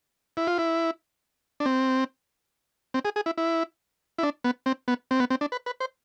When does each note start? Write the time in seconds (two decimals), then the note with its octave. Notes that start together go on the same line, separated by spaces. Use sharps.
0.37 E4
0.47 F4
0.58 E4
1.60 D4
1.66 C4
2.94 C4
3.05 G#4
3.16 G#4
3.26 E4
3.38 E4
4.18 E4
4.23 D4
4.44 B3
4.66 C4
4.88 B3
5.11 C4
5.20 B3
5.30 C4
5.41 D4
5.52 B4
5.66 B4
5.80 C5